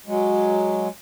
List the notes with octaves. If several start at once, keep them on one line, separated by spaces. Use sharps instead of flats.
F#3 G#3